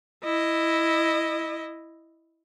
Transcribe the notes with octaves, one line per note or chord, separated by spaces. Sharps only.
E4 D#5